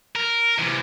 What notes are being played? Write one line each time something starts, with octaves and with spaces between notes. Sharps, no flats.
A#4
E2 C3